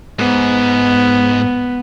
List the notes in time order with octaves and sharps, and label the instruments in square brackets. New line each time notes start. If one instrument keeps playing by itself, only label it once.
[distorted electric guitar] G#2 [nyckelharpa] B3